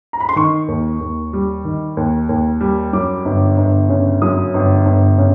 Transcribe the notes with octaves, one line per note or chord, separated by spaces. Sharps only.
A#5
B5
C6
D#3 C#6
D#2
D#2
G3
D#3
D#2
D#2
G3
F#2 D6
G1
G1
C#3
F#2 D#6
G1
G1
C#3